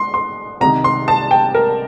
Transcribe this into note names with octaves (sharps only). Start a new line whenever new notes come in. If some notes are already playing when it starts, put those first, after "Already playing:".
Already playing: C6
C6
C2 C3 D#3 A#5
C6
A5
G5
A#4